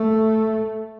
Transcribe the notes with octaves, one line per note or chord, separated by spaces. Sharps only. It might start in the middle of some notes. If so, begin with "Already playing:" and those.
Already playing: A3